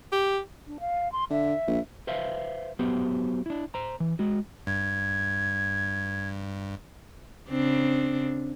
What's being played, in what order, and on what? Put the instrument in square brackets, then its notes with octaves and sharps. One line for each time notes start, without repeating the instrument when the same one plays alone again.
[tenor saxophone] G4
[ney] D4
F5
C6
[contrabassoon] D3 [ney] E5
[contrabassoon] A#1
[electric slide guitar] B4 C5 E5 F5
F#3 B3 G4 C5
D4 E4
C5 A#5
E3
G#3 F#4
[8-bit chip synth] G2 [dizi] G#6
[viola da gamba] C#3 C4 D4